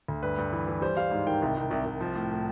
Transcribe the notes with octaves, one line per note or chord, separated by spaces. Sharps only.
D2
G2 B4
G2
E3
E3
G3 C5
G3 F5
G#2
D#3 G5
C2
C2
C2
C2
F3
A2
A2